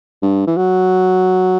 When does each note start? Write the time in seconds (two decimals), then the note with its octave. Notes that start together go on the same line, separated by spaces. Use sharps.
0.22 G2
0.47 E3
0.57 F#3